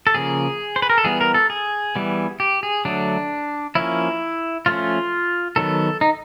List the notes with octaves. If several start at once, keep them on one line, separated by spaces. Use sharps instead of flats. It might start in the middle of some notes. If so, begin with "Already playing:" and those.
A4
C#3 F3 A#3 G#4
C5
B4
A#4
A4
E3 G3 B3 G#4
A#4
A4
G#4
E3 G3 B3
G4
G#4
D3 F#3 A3 D4
F3 A#3 C#4 E4
F3 A3 C#4 F4
D#3 F#3 B3 A4
D#4